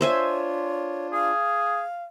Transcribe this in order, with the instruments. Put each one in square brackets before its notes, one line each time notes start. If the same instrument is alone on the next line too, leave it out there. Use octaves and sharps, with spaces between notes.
[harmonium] D4 F4 [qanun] C5 E5 G#5 [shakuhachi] C#5
[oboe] G#4 [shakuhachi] F5